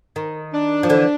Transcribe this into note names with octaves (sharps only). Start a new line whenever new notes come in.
D#3
D4
F3
D3 E3